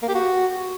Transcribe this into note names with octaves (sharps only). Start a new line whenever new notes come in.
A#3
G4
F#4